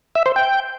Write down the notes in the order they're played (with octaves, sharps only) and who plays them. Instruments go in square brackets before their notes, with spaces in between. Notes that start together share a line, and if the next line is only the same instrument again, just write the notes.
[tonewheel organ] E5
C5
G5